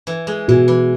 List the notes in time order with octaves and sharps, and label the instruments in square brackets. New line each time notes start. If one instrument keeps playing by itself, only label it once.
[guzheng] E3
G#3
[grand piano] B2 [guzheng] E3
[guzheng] E3